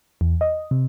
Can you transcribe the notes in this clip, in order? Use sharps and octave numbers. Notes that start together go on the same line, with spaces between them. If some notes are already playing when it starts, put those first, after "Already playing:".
E2
D#5
C3